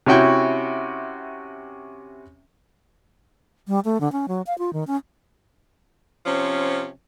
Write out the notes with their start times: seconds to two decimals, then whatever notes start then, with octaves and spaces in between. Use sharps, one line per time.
0.06 C3 C#4 E4 F#4 G5 C#6
3.68 G3
3.85 A3
4.01 D3
4.12 C#4
4.28 F#3
4.47 F5
4.58 F4
4.73 D#3
4.87 C#4
6.25 C3 F3 C#4